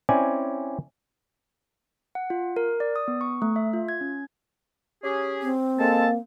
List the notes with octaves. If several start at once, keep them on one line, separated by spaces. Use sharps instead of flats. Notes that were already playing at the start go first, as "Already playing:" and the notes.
C4 C#4 E4 D5 G#5
F#5
F4
A#4
D5
D#6
B3
C#6
A3
E5
F4
G#6
C#4
C#4 G4 G#4
C4
G#3 A#3 A4 A5